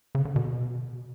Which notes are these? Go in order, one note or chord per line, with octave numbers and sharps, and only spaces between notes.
C#3
D3
B2